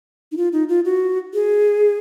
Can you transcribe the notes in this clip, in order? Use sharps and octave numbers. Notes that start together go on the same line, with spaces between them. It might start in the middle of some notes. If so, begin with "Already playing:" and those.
D#4
F4
D#4
F4
F#4
G#4